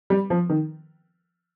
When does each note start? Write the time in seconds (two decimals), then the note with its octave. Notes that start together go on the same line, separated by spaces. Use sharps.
0.10 G3
0.30 F3
0.50 D#3